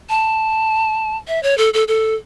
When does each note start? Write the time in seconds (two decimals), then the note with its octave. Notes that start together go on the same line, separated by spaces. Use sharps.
0.09 A5
1.28 E5
1.43 C#5
1.58 A4
1.74 A4
1.88 A4